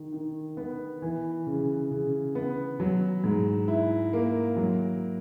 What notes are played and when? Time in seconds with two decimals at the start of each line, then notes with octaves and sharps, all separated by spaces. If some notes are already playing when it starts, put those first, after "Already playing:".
Already playing: D#3
0.13 D#3
0.57 B3
1.02 E3
1.46 C#3
1.91 C#3
2.35 B3
2.80 F#3
3.24 G#2
3.68 E4
4.13 A#3
4.57 F#3